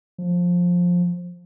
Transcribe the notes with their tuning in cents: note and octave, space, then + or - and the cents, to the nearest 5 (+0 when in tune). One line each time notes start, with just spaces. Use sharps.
F3 +15